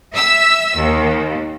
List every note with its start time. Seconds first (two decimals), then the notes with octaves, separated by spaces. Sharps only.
0.12 E5 E6
0.74 D#2